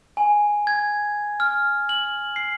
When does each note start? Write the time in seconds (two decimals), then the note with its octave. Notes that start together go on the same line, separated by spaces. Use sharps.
0.17 G#5
0.67 G#6
1.40 F6
1.89 F#7
2.36 C7